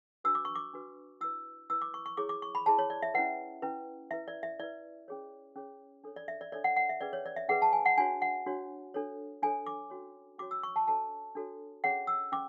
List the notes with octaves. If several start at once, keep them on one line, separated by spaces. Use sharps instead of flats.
D4 F#4 B4 E6
D6
C#6
D6
D4 F#4 B4
E4 B4 E6
E4 B4 E6
D6
C#6
C#6
E4 G#4 C#5 D6
D6
C#6
B5
E4 G#4 C#5 A5
C#5
D5
E5
C#4 E4 B4 F#5
C#4 E4 B4
E4 B4 E5
D5
E5
E4 B4 D5
C#4 G#4 C#5
C#4 G#4 C#5
D4 A4 C#5
D5
E5
D5
D4 A4 C#5 D5
F#5
F#5
E5
C#4 G#4 B4 D5
C#5
D5
E5
C#4 G#4 B4 F#5
A5
G#5
F#5
D4 F#4 C#5 G#5
F#5
D4 F#4 C#5
D4 A4 C#5
D4 A4 C#5 G#5
D6
C#4 F#4 C#5
C#4 F#4 C#5 D6
E6
C#6
A5
D4 F#4 A4 C#5 A5
D4 F#4 A4 C#5
C#4 G#4 C#5 F#5
E6
C#4 D6